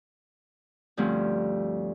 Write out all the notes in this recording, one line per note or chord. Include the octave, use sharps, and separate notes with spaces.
D2 G2 F3 C4 C#4